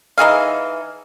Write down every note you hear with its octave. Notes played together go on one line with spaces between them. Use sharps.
E3 D#4 G#4 F5